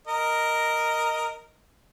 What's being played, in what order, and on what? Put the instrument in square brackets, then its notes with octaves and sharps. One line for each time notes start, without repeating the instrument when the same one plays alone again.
[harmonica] A#4 D#5